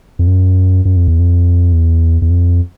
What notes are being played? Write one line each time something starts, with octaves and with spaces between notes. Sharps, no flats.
F2
F#2
F#2
F2
E2
F2
E2
E2
F2